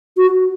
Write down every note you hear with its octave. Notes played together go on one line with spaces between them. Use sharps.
F#4